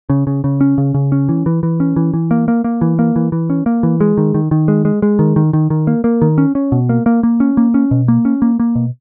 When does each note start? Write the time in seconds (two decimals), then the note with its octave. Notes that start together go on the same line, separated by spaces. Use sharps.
0.10 C#3
0.27 C#3
0.44 C#3
0.61 C#4
0.78 C#3
0.94 C#3
1.12 C#4
1.29 E3
1.46 E3
1.63 E3
1.80 C#4
1.96 E3
2.14 E3
2.31 A#3
2.48 A#3
2.64 A#3
2.81 E3
2.99 A#3
3.16 E3
3.32 E3
3.50 C#4
3.66 A#3
3.83 E3
4.01 G#3
4.17 D#3
4.34 D#3
4.51 D#3
4.68 G#3
4.85 G#3
5.02 G#3
5.19 D#3
5.36 D#3
5.53 D#3
5.70 D#3
5.87 A#3
6.04 A#3
6.22 D#3
6.38 C#4
6.55 C#4
6.72 B2
6.89 A#3
7.06 A#3
7.23 A#3
7.40 C#4
7.57 A#3
7.74 C#4
7.91 B2
8.08 A#3
8.25 C#4
8.42 A#3
8.60 A#3
8.75 B2